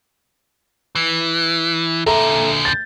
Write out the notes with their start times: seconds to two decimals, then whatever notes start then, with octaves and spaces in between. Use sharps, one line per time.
0.95 E3
2.06 A#2 D3 A4 E5 A#5
2.65 G6 A6